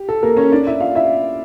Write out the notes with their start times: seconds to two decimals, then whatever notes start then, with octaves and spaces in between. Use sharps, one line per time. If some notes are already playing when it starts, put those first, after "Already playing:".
Already playing: G4
0.09 A4
0.23 A#3 A#4
0.37 C#4 C#5
0.52 D4 D5
0.67 E4 E5
0.80 F4 F5
0.95 E4 E5